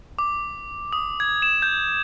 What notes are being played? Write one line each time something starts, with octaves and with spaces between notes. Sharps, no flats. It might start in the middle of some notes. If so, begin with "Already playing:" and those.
D6
D#6
G#6
E7
G6